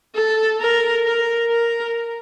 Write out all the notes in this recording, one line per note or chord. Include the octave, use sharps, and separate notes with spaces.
A4
A#4
A#4
A#4